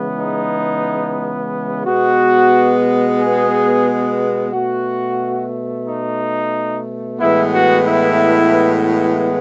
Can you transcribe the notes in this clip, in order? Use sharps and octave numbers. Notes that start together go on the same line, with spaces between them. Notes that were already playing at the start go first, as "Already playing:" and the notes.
Already playing: C#3 E3 G#3 B3
D#4
B2 G#3 B3 F#4
G#4
B2 A3 F#4
D#4
A2 E3 G#3 B3 E4
F#4
E4